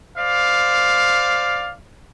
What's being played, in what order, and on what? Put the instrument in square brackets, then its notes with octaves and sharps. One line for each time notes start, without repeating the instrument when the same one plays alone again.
[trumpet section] C5 D5 F5